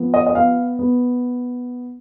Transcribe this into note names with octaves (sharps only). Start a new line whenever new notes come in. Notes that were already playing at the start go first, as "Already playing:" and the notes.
Already playing: F3 B3
D#5
D#5
B3 F5
B3